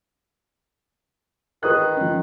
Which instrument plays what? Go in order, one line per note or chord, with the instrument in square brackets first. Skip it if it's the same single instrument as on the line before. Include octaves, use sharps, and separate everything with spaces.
[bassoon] D#3 [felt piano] B4 D#6 F#6
[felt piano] F3 C#4